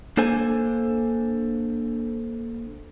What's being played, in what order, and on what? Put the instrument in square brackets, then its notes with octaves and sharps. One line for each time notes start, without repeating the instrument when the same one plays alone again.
[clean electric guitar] A#3 D4 A4 C5 G#5